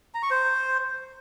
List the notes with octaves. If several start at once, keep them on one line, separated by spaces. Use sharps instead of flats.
A#5
C#6
C5